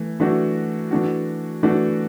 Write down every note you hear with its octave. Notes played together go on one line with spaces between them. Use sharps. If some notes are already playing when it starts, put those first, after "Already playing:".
Already playing: E3 A3
E3 A3 D4 F#4
E3 A3 D4 F#4
E3 A3 D4 F#4